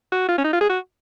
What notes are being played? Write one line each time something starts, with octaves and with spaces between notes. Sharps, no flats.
F#4
F4
C#4
D#4
F4
G#4
F#4